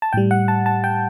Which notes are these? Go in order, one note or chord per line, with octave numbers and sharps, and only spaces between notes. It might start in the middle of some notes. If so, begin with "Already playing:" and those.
A5
A2 G3 G5
F#5
A5
A5
G5